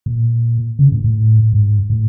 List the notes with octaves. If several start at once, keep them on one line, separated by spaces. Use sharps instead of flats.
A#2
C#3
A2
A2
G#2
A2